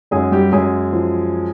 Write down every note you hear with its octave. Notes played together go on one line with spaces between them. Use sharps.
F#2 G#3 G#4
G3 G4
F#2 G#3 G#4
F3